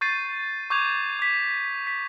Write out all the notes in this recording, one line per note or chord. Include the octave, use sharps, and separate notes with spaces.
C#6 G6 A6 C7 D#7
C#6 D6 G6 G#6 F7
D6 B6
B6